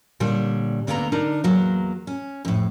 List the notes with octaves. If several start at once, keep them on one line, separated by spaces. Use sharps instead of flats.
A#2 D3 G3 C#5
D2 D3 A#3 B3 F#5 A#5
D3 D4 D#4 A#4
E2 F#3 A#3
C#4
F2 A2